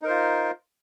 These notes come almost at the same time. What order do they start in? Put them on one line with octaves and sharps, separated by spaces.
D#4 A#4 C5 F4